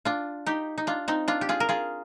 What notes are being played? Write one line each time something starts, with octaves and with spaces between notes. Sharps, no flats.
D4 F4
D#4 G4
D#4
D4 F4
C4 D#4
D4 F4
G4
F4 G#4
A#4
F4 G#4